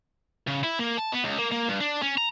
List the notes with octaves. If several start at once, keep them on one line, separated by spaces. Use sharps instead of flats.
C#3
E4
A#3
A5
B3
C#2
A#3
A#3
G2
D4
C#4
A#5